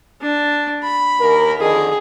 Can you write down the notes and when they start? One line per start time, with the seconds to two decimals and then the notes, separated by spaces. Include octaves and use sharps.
0.22 D4
0.83 B5
1.20 D#2 A#4
1.59 F2 D3 D#3 G#4